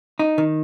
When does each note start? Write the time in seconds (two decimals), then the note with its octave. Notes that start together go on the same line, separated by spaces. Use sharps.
0.19 D#4
0.38 D#3